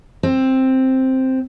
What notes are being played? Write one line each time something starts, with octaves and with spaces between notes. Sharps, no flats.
C4